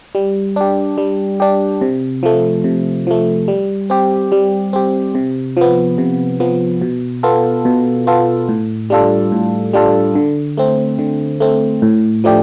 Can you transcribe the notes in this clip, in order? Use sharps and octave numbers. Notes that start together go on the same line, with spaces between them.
G3
D4 G4
G3
D4 G4
C3
F3 A3
C3
F3 A3
G3
C4 G4
G3
C4 G4
C3
F3 B3
C3
F3 B3
B2
B3 F4 A4
B2
B3 F4 A4
A2
G3 D4 F4 A4
A2
G3 D4 F4 A4
D3
A3 C4
D3
A3 C4
A2
F3 A3 D4 G4